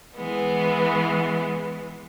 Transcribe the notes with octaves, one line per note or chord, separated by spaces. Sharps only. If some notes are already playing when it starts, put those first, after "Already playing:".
E3 G#3 B3